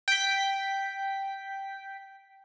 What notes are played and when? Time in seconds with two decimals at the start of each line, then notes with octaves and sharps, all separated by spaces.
0.08 G5 B6